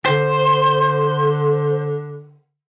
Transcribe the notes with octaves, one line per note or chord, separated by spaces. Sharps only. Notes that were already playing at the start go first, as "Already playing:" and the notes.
D3 C5